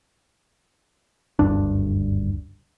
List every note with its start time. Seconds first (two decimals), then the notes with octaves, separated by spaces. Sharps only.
1.39 F#1 D2 G2 D4